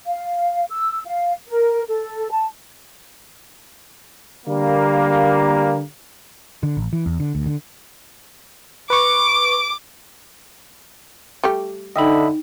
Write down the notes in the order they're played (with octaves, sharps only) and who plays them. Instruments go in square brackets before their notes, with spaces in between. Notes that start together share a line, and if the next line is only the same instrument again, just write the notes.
[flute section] F5
E6
F5
A#4
A4
A5
[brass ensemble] D3 G3 A#3
[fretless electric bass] D3
A1
E3
E2
D3
D2
D3
[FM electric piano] B4 C#6 [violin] D6
[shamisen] G3 A3 G4
[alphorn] D3 [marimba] D#4 G5 [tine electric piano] D#5 E5 B5